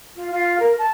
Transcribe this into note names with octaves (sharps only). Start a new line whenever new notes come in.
F4
F4
A#4
A5